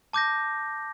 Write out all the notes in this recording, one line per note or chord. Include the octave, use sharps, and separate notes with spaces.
A5 D6 G6 A#6